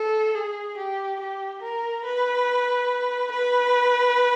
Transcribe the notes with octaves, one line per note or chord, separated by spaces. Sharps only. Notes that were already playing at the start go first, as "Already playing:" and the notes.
Already playing: A4
G#4
G4
G4
A#4
B4
B4